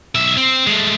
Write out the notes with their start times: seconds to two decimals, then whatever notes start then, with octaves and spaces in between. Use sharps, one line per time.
0.15 B1 E5
0.37 C4
0.67 G#3 A3